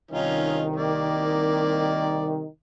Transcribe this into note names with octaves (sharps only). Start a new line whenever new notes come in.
C2 D#3 C#4 D#4 F4
A#3 D5